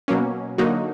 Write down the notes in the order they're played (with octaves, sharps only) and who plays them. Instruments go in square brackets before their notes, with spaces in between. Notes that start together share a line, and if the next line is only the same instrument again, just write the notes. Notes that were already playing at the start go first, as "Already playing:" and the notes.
[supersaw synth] B2 F#3 A#3 C#4
D3 F#3 A#3 D#4 F#4